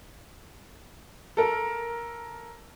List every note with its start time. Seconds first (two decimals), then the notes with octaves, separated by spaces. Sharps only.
1.37 A4 A#4